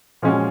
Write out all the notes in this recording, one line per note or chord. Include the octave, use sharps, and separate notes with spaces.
A#2 F3 G#3 C#4 F#4